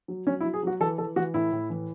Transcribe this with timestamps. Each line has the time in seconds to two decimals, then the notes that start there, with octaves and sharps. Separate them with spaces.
0.08 F#3
0.27 F#3 C#4
0.41 E4
0.45 F#3
0.53 G#4
0.63 F#3 F#4
0.80 E3 A4
0.98 E3 A4
1.16 E3 F#4
1.34 A2 E4
1.52 A2
1.70 E3